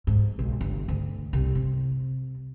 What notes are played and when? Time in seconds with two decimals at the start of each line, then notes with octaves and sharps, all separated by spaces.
0.07 G#2
0.39 B1
0.61 G1
0.88 D2
1.33 C2
1.55 C3